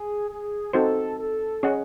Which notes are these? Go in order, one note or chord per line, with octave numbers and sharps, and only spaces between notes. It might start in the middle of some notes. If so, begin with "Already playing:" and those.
Already playing: G#4
G#4
C4 D#4 F#4 A4 C5
A4
C#4 G#4 D#5 F#5